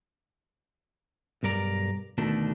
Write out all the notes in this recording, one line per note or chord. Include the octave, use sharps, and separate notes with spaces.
B1 G2 A#4 D5 A#5
D2 B2 D#3 A3 D4